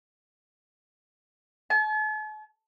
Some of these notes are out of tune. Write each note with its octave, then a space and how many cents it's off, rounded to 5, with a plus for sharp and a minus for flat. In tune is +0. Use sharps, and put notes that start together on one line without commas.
A5 -45